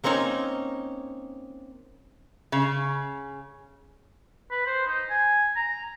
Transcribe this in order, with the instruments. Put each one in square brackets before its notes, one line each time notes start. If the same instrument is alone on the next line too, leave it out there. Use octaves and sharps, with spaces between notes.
[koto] A#3 C4 C#4 D#4 C#5
[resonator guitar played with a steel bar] C#3
[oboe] B4
C5
D#4
G#5
A#5